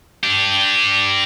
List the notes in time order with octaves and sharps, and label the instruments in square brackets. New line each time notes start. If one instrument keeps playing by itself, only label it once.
[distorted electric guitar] D4 G4